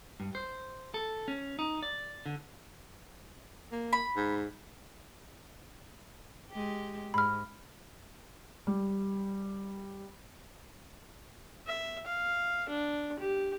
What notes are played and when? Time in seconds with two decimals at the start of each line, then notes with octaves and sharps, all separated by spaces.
0.20 G2
0.35 C5
0.94 A4
1.28 C#4
1.59 D#4
1.83 D5
2.26 D3
3.72 A#3
3.93 B5
4.16 G#2
6.51 G#3 G4
7.14 G#2 B5 F6
8.67 G3
11.67 E5
12.06 F5
12.69 D4
13.19 G4